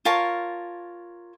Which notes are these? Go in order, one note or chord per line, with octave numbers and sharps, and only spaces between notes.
F4 A#4 C#5 A5